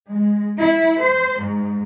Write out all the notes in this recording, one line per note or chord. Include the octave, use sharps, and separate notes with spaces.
G#3
E4
C5
G#2